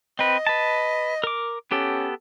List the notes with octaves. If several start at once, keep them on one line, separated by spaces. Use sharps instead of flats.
C4 B4 D#5
B4 A5
A#4 D6
B3 C#4 G4 A4